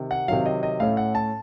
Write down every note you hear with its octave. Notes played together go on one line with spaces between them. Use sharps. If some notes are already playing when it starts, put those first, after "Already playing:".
Already playing: C3 D#3
F#5
C3 D#3 F#3 F5
D#5
D#5
A2 A3 C#4 F5
F#5
A5